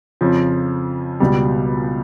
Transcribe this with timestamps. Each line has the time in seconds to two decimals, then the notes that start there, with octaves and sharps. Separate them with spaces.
0.21 F2 C#3 F3
1.20 C#2 B2 G3